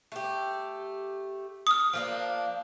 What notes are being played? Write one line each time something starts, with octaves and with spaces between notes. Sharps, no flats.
A3 G4
D#6 F6
F3 A#3 D4